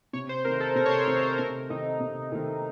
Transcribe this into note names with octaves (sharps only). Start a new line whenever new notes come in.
C3 C#5
C5
D#3 A3 C4 A#4
A4
C3 A#4
C#5
C5
D#3 A3 C4 C#5
C5
C3 A#4
D#3 A3 C4 D#4
C3
D#3 A3 C4